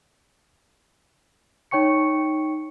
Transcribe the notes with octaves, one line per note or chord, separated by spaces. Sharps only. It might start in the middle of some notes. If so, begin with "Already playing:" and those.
D#4 C#5 G5 C#6 C#7